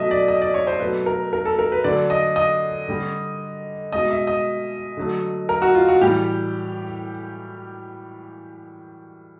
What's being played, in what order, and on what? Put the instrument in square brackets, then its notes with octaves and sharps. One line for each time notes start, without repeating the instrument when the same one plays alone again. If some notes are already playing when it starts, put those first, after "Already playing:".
Already playing: [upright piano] B2 F#3 A3 D#5 E5
D5
D#5
D5
C#5
C5
B2 F#3 A3 B4
A#4
A#4
A4
A#4
B4
D3 F#3 A3 D5
D#5
D#5
D3 G3
B2 G#3 D#5
E5
D#5
D3 F#3 A3
A#4
F#4
F4
F#4
A2 E3 G3 G4